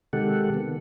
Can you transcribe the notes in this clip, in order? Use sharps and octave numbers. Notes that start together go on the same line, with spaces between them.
C3 D#3 G#3 G4 A4 F#5
D#3 B3